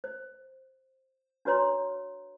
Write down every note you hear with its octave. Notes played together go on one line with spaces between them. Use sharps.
C5
D4 F#4 B4 C#5 A#5 C6